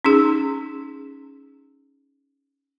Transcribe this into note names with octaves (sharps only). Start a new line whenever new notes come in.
C#4 D#4 G#4